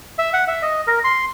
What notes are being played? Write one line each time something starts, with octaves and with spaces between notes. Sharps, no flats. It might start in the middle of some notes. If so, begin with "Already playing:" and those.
E5
F#5
E5
D#5
A#4
C6